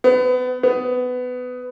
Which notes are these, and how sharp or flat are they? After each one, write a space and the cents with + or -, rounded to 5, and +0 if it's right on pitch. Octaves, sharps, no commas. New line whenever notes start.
B3 +30
B3 +20